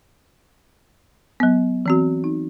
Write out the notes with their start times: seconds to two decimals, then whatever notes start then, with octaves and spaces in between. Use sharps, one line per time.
1.40 F#3 B3
1.86 E3 C4 F#4
2.24 D#4